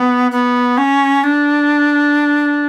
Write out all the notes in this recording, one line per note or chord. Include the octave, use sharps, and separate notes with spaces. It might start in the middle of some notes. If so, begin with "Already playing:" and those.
Already playing: B3
B3
C#4
D4